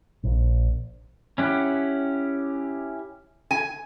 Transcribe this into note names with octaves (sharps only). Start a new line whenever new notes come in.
A#1
C#4 E4 G4 F#5
G#5